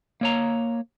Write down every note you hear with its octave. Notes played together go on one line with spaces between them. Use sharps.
A#3 C#5 A#5